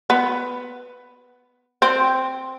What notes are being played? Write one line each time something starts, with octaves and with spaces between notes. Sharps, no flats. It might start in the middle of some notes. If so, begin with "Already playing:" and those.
B3
C4